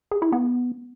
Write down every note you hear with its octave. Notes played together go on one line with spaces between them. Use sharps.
G#4
E4
B3